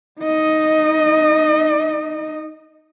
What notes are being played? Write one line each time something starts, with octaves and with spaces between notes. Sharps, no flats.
D#4 D#5